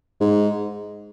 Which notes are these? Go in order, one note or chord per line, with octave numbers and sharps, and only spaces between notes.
G#2